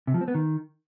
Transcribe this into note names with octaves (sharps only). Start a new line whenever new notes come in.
C3
F3
C4
B3
D#3